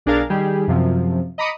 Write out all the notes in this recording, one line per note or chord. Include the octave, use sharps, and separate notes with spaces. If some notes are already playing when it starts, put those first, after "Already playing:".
B1 D4 G#4 A#4 F5 A6
D#3 G3 G4 G#4
F#2 C3 F3
D#5 A#5 B5 D6 D#6 C#7